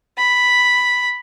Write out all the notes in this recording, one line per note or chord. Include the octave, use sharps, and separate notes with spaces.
B5